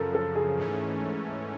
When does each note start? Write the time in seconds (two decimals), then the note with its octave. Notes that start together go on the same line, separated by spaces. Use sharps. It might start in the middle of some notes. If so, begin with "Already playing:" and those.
Already playing: F#2 C#3 F3 A4 A#4
0.15 A4
0.35 G#4
0.57 G#2 E3 A3 C#4